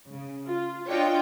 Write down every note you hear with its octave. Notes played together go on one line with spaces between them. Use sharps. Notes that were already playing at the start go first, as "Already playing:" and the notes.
C#3
F4
D4 F4 C#5 D#5 G5